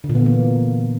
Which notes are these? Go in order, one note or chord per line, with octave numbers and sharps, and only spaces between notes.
D3
A#2
B3
E3
A#3